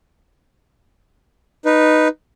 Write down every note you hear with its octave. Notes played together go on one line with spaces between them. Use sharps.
D#4 B4